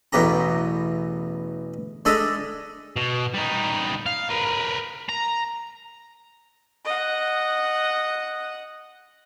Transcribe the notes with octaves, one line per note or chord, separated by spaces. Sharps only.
A1 E2 B2 G4 A#5
G#3 D4 A4 D#5 E5
B2
G3 D#4
F5
A#4 B4
A#5
D#5 F#5